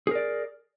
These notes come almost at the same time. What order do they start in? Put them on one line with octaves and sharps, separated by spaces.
G#4 A#4 D5